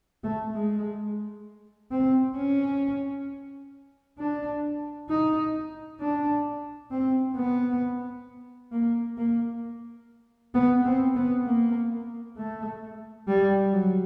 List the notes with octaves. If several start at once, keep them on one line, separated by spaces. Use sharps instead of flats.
A3
G#3
C4
C#4
D4
D#4
D4
C4
B3
A#3
A#3
B3
C4
B3
A#3
A3
G3
F#3